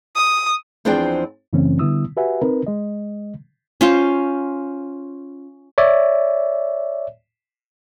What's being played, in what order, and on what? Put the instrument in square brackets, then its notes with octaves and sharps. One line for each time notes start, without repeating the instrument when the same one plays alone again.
[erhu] D#6
[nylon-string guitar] E2 F3 C4 D4 G#4 G5
[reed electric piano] F#2 C#3 E3 A3 C4 C#4
D3 G3 B3 E4 D#6 E6
F#4 G4 B4 E5 F#5 G#5
C4 D#4 A#4 B4
G#3 D#5
[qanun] C#4 F4 C5
[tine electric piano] C#5 D5 E5